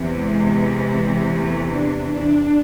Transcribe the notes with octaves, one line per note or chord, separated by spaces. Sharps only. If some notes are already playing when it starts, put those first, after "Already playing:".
Already playing: E2 C3 E3
G#3
A3
D4
D4